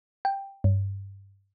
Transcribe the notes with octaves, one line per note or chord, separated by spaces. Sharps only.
G5
G2